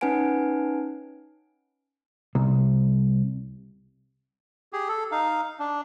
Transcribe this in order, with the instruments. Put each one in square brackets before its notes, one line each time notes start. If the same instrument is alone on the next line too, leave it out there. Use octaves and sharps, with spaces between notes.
[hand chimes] C#4 D#4 B4 F#5 G#5 D7
[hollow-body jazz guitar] C2
[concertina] G4 G#4
A4
D#4 F5
D4